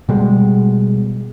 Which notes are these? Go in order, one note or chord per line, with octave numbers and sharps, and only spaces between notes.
B2 G3 G#3